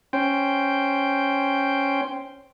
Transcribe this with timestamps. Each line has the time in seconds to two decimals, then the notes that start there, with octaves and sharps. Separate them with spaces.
0.13 C#4 C5 G5